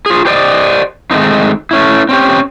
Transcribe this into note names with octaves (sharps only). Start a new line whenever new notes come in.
F4 G#4
G4 C5 D5 D#5
D#3 G#3 A3 C4 D#4
A3 C#4 E4
C4 C#4 G4